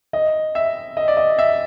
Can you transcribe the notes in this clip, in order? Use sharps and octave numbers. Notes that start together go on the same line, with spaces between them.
D#5
E5
D#5
D5
D#5
E5